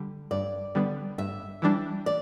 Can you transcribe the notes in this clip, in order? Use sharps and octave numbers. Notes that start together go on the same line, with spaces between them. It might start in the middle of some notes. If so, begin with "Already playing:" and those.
Already playing: D3 G3
G2 D5
D3 G3 B3
G2 E5
E3 G3 D4
D5